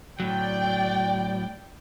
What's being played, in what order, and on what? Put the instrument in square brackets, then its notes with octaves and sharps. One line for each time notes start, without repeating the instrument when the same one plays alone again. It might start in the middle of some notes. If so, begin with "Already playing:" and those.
[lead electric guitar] A2 F#3 [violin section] D5 G5